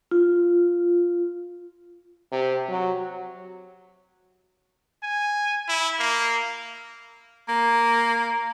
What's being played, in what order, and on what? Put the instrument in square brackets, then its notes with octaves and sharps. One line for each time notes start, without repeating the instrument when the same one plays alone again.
[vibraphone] F4
[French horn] C3
F#3
[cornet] G#5
E4
A#3
[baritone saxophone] A#3